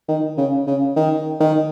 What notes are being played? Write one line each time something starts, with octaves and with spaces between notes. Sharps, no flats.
D#3
C#3
C#3
D#3
D#3